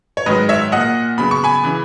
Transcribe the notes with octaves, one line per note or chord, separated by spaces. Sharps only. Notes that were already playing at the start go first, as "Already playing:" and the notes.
C#5
G#2 D#3 F#3 B4 D#5
C#5 E5
A#2 A#3 D#5 F#5
C#3 F#3 B3 B5
C#6
G#5 B5
C#3 E3